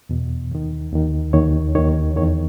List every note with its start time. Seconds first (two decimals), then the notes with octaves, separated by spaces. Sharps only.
0.09 E2 B2
0.51 D#2 D#3
0.92 D#2 D#3
1.33 D#2 D#3 C#5
1.75 D#2 D#3 C#5
2.16 E2 D#3 C#5